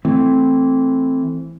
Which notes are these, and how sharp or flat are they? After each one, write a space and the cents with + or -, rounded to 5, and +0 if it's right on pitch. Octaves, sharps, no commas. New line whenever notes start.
E3 +0 A3 +0 C4 +0